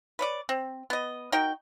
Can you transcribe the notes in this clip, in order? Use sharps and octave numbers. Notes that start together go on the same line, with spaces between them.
B4 C#5 D5
C4
B3 D#5
D#4 F#4 A#4 G5